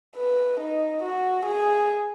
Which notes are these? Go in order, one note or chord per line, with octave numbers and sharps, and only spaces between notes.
B4
D#4
F#4
G#4